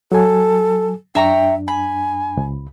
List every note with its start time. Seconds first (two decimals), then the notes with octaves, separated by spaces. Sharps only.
0.12 F#3 A4 G#5
1.15 F#2 D4 E5 G5 A#5 C#6
1.68 G#5 B5
2.37 C#2